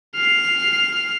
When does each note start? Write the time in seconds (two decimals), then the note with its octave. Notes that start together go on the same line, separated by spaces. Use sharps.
0.15 F6 C7